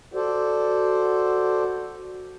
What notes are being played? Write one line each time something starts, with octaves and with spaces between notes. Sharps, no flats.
F#4 A4 C5 D5